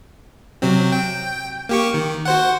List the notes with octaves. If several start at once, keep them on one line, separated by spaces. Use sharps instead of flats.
C3 F#3 C4
G5
A#3 G4 C#6
D#3
F#4 C5 F#5